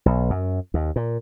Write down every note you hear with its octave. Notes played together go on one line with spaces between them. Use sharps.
B1
F#2
D#2
A#2